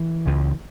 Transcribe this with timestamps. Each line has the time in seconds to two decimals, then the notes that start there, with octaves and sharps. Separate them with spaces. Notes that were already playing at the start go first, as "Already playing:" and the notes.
Already playing: E3
0.26 C#2 C#3